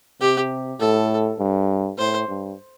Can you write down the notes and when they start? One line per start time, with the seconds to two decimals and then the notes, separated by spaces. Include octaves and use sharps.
0.21 C3 G4
0.80 A2 A4
1.39 G2
1.98 A2 C5
2.28 G2